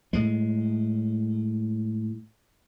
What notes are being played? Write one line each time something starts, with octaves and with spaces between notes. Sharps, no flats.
A2 G#3